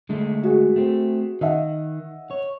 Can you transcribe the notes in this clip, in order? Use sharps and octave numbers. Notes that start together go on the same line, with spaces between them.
D3 G#3 A3
F#4 G#4
A3 C4
D#3 D#5 E5 F#5
C#5